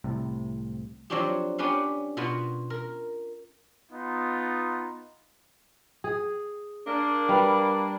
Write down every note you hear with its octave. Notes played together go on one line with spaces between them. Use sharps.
C2 A2 C3
F3 F#3 C4 D4 F#4 G4
B3 C#4 D4 G4 B4 F5
B2 B3 F4 F#4
A#4
B3 D#4 F4
G#4
A#3 D4
G3 B4 F5